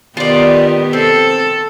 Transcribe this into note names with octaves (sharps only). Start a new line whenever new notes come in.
D#3 B3 F4 G4 D5
C4 A4